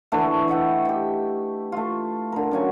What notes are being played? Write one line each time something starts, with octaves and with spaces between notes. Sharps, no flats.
D3 E3 A3
D#5 E5 F#5 G5
G4 G5
A3 F4
D3 A#4
C#3 F#3 G#5